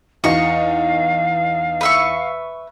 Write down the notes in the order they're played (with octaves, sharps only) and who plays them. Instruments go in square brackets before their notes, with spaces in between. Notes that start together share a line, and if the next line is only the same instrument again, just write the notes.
[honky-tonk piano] E2 D#4 D#5 [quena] F5 [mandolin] C#6
[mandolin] B4 E5 C#6